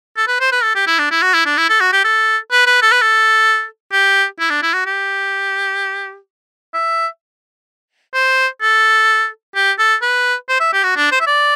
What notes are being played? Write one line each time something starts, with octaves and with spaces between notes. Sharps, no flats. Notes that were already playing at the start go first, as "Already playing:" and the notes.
A4
B4
C5
B4
A4
G4
E4
D4
E4
F#4
E4
D4
E4
A4
F#4
G4
A4
B4
B4
A4
B4
A4
G4
E4
D4
E4
F#4
G4
E5
C5
A4
G4
A4
B4
C5
E5
G4
F#4
D4
C5
E5
D5